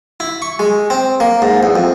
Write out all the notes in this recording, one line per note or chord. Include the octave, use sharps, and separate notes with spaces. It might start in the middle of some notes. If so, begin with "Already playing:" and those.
E4
C#6
G#3
C4
A#3
G#2
E2
F2